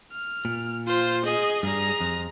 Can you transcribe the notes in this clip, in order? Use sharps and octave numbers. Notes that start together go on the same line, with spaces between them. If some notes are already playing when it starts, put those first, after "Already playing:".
F6
A#2
F4 C5
G#4 D#5
G2 G3 G#4 A#5
F2